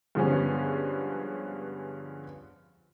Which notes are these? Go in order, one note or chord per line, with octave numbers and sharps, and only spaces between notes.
G2 D3 F3 G#3 B3 C#4